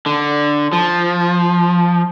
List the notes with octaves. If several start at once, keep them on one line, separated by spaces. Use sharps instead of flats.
D3
F3